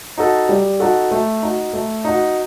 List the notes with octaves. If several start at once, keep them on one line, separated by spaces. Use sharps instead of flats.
D#4 F#4 A4
G3
D#4 F#4 A4
A3
D#4 F#4
A3
D#4 F#4